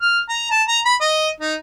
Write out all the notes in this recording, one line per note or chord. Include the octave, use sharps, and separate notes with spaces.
F6
A#5
A5
A#5
B5
D#5
D#4